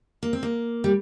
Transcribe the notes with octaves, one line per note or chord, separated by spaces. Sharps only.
A#3
C4
A#3
G3